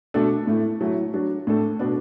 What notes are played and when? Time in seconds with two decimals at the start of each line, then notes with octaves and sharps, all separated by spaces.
0.14 B2 A3 D4 A4
0.47 A2 A3 E4
0.81 F#3 A3 E4
1.13 F#3 D4 F#4
1.47 A2 A3 D4 A4
1.79 B2 B3 D4